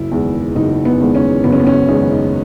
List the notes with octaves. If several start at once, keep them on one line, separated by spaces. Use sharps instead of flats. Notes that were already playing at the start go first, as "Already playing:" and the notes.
Already playing: F#1 E4
E2 D#3 G#3
F#1 D#4
B3
E2 D#3 G#3
C#4
F#1 B3
C#4
B3
C#4
E2 D#3 G#3 D#4
D#4